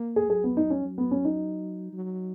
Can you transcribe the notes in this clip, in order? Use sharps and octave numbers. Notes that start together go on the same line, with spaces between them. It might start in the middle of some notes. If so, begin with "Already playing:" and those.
Already playing: A#3
G#4
F#3 G#4
B3
D#4
C#4
F#3
B3
C#4
D#4
F#3